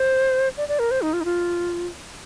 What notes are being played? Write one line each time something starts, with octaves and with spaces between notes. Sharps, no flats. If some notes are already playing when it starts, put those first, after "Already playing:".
Already playing: C5
D5
D5
A#4
C5
D#4
F4
D#4
F4